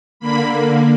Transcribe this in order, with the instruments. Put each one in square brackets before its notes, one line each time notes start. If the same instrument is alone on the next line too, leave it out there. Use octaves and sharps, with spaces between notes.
[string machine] D3 A#3 B5